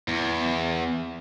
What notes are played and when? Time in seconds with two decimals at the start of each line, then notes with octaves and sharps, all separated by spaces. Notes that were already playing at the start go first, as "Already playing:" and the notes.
0.08 E2